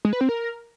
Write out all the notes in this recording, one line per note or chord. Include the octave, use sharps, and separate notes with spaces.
G#3
B4
C4
A#4